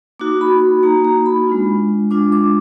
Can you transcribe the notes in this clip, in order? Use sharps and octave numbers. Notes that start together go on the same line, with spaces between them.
A#3 D#4 F#4 D6
B5
A#3 D#4 F#4 A#5
A#5
B5
G#3 D4 F4
G#3 D4 F4 D6
D6